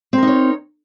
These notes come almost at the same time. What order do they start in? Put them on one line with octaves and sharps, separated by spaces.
C4 A#4 D#4 C#5